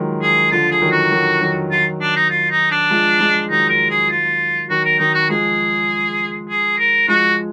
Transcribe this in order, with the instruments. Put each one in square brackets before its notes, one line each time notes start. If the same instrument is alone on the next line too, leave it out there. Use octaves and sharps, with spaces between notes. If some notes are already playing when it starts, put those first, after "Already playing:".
Already playing: [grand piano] D#3 F3 F#3 G#3
[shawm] G#4
[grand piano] D3 F3 [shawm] F4
[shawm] G#4
[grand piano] D#3 F#3
[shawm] F#4
[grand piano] D#3 F#3
D#3 F#3
[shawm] F4
D4
D#4
F4
D#4
D4
[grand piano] F3 G#3
F3 G#3
[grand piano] D#3 F#3 [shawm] D#4
[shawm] A#4
G#4
F4
[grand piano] D#3 F#3 [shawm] F#4
[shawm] A#4
[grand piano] D#3 F#3 [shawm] D#4
[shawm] F#4
[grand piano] F3 G#3 [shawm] G#4
[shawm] G#4
A#4
[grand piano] F3 G#3 [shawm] F#4